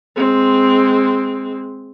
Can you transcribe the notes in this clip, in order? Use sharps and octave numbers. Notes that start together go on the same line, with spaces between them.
G#3 C4